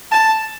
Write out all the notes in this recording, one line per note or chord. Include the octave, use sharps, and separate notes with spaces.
A5